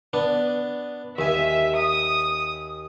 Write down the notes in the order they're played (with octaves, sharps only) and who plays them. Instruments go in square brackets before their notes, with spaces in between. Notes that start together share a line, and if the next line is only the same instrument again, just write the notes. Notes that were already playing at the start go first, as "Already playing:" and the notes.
[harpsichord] B3 D4
[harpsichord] D#2 G#5 [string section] E5
[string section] D#6